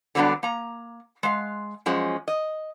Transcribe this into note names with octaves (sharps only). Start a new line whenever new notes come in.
D3 F#3 G3 B3 D4
A#3 A#5
G#3 F5
F#2 F3 G#3 C#4
D#5